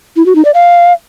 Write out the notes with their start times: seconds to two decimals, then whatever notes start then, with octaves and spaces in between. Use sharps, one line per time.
0.16 E4
0.26 F#4
0.35 D#4
0.45 D5
0.54 F5